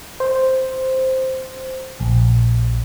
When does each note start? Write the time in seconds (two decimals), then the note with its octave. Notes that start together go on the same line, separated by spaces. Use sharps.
0.20 C5
2.00 A#1